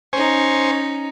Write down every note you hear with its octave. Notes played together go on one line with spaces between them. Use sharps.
C#4 D#4 C5 G#5 C#6